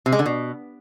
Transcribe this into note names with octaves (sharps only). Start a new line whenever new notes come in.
C3
G#3
D3
B2